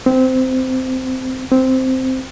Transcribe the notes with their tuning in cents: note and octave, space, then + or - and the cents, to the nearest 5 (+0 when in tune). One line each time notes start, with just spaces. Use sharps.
C4 -15
C4 -5